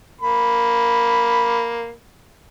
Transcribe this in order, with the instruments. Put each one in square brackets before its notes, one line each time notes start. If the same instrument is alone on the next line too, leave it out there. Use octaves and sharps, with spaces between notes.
[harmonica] A#3 B5